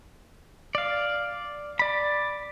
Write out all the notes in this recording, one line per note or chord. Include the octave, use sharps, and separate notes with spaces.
D5 F5
D5 B5